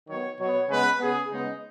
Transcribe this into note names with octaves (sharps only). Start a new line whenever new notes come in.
D#3 F#3 B3 C#5
B2 F#3 B3 C#5
C#3 G#3 B3 B4
C#3 B3 G#4
C#3 G#3 B3 D#4